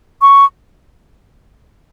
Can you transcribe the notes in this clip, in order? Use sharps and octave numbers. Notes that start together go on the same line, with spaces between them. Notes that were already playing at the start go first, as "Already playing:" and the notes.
C#6